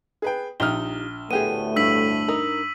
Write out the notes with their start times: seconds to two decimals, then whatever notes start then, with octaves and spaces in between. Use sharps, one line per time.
0.22 G#4 B4 G5
0.60 A#1 D#4 F4 G4 F6 G7
1.31 D2 A2 A3 B3 G4 G#4 D#7
1.76 G2 E6 B6 F#7
2.28 D#4 A#4